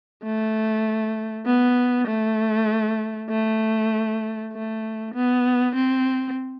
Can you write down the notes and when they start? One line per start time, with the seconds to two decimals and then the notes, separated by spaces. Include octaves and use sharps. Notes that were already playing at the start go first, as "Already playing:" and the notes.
0.24 A3
1.46 B3
2.08 A3
3.30 A3
4.53 A3
5.14 B3
5.75 C4